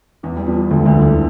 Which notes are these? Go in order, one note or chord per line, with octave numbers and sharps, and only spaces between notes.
E2 E3
G3
F2 F3
D2 D3
D2 D3
E2 E3